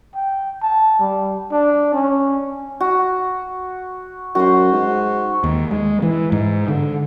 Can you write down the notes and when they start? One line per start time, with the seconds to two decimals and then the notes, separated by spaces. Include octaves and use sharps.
0.15 G5
0.62 A5
0.99 G3
1.52 D4
1.93 C#4
2.80 F#4
4.35 F#2 F#4 C5
4.72 G#2
5.44 D#2
5.71 G#3
6.02 E3
6.32 G#2
6.68 D3